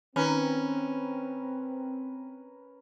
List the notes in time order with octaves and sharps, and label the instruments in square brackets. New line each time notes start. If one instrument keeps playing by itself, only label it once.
[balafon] D#3 D#4 A#5 [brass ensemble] C4 [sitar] C#4 [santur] A#4 B4